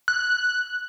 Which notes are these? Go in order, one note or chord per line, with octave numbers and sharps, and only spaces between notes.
F#6